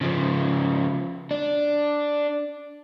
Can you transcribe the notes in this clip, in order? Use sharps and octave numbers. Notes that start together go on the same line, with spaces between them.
C#3 F3
D4